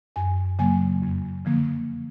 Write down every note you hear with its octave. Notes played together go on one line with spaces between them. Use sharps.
F#2 G#5
C#3 F#3 A#3 G#5
F2
D3 F3 A#3